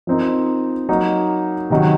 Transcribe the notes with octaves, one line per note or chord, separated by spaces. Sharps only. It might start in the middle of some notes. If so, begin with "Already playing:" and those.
F3 C4 D#4 A#4
F#3 A#3 D#4
C3 D#3 F#3